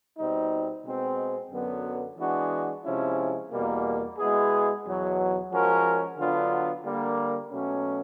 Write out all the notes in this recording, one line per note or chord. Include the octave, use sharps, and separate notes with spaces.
B2 G3 C4 D#4
B2 G#3 C4
F#2 D3 F#3 B3
E3 G#3 B3 D4 F#4
C3 F3 G#3 C#4 E4
E2 B2 G3 A#3
B2 G#3 B3 E4 G#4
E2 B2 F#3
F3 G#3 C#4 F#4 A#4
D3 F#3 B3 D4 F4
D3 G3 A#3
B2 F#3 A3 C#4